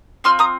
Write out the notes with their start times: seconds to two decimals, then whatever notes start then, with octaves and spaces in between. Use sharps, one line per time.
0.24 C4 F4 C6 F6
0.39 A#5 D#6